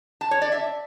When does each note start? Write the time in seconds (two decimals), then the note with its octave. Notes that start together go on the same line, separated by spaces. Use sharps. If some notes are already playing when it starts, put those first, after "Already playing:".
0.21 A5
0.31 C#5
0.42 D5
0.52 E5